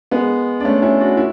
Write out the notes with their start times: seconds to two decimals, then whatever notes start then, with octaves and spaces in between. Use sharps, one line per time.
0.11 G#3 B3
0.60 D4
0.65 A3 C#4
0.82 C#4 E4
1.00 D4 F#4
1.17 E4